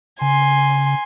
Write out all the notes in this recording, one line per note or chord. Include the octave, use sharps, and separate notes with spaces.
C#3 G#5 C6